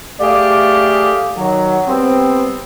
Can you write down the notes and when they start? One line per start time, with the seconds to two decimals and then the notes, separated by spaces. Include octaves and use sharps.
0.21 A3 G4 G#4 D5 F5
1.38 D#3 F#3
1.88 G3 B3 C4